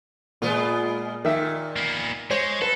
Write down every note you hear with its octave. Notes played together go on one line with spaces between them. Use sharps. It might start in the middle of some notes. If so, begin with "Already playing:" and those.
A#2 G#3 B3 F4
A#2 D#3 E5
A#3 B3
G#3 C5 C#5
A4 B4